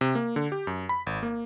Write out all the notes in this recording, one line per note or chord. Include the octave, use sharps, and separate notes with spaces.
C3
A#3
D3
G4
F#2
B5
G#1
A#3